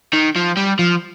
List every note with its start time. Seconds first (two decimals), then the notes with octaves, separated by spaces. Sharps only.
0.13 D#3
0.36 F3
0.57 G3
0.79 F3